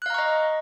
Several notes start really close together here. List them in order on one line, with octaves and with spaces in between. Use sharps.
F#6 F5 A#5 C#6 D#5